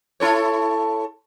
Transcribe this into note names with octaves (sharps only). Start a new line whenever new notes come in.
E4 A4 C#5